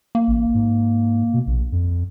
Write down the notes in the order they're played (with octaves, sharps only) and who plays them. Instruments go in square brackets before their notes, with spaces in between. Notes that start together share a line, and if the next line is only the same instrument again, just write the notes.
[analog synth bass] A#3
[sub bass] A1
G#2
B2
A#1
F2